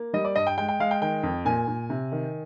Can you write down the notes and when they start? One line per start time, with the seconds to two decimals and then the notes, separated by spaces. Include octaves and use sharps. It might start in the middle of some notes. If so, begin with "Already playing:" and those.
Already playing: A#3
0.14 G3 D#5
0.25 D5
0.36 G2 D#5
0.47 G5
0.58 G#3 G5
0.69 G5
0.80 G#3 F5
0.91 G5
1.01 D#3 G5
1.23 F2
1.45 A#2 G#5
1.67 A#2
1.90 C3
2.12 D#3